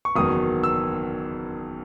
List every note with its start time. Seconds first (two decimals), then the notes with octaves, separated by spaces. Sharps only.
0.05 C#6
0.16 F#1 E2 D#3 F#3 D#6
0.64 E6